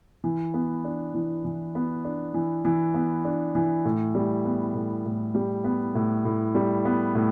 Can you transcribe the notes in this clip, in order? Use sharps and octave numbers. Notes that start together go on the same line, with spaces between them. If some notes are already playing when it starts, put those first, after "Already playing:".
E3
B3
D4
E3
E3
B3
D4
E3
E3
B3
D4
E3
A2
G3
B3
A2
A2
G3
B3
A2
A2
G3
B3
A2